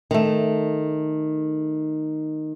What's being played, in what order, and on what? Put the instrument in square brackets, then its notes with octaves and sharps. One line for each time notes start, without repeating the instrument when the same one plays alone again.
[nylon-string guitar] D#3 A3